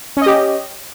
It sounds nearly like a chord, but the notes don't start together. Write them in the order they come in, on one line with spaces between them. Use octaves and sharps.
C#4 D#5 G4